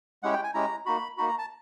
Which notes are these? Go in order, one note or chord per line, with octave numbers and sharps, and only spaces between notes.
G#3 C#4 E4 G4 F#5
G5
G#5
G#3 C#4 E4 G4 A#5
A#3 D#4 F#4 B5
A#3 D#4 F#4 B5
A#5
A5